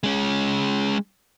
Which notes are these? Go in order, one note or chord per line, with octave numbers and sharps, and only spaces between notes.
G#3 C#4